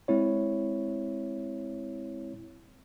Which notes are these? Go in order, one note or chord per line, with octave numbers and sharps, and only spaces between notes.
G#3 C4 E4 C#5